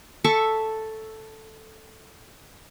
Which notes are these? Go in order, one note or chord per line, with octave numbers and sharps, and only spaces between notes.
A4 E5 A5 C#6